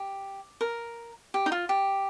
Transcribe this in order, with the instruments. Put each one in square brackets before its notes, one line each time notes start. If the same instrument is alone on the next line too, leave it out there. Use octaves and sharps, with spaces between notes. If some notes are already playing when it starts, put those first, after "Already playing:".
Already playing: [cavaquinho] G4
A#4
G4
D#4
F4
G4